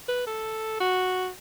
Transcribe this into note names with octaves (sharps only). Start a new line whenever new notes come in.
B4
A4
F#4